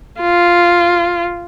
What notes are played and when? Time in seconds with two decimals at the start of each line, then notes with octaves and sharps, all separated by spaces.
0.21 F4